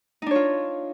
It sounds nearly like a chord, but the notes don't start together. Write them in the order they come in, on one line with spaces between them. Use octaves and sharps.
D#4 D4 C#5 F4